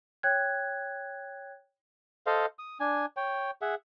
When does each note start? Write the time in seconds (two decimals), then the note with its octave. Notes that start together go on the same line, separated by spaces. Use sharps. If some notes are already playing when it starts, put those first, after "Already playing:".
0.23 C#5 G5 F#6 G#6
2.26 A4 C5 D#5 F5
2.59 D#6
2.80 D4 G#5
3.17 C#5 G5
3.62 G#4 E5 F#5